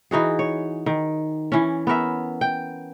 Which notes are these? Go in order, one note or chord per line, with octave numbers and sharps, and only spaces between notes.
E3 D#4 F#4 G#4
C#5
D#3
E3 C#4
B3 C#4 A#4 E5
G5